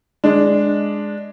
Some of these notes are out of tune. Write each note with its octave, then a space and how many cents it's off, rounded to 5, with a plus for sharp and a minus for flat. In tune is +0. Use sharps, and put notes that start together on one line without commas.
G#3 +0 D4 +0